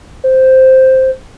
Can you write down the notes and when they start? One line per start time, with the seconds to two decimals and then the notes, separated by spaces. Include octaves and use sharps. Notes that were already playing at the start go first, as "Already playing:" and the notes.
0.24 C5